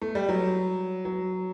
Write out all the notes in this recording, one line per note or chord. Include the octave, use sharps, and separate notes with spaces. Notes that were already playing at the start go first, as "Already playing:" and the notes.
A3
G3
F#3
F#3